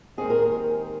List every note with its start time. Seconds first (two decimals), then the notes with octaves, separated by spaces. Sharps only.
0.17 D#2 D#3 G#3 C4 G#4
0.30 A#4